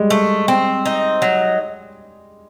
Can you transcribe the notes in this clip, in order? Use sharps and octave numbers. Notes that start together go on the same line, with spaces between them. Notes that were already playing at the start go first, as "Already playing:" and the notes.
Already playing: G3 G#3
A3
C4
D#4
F#3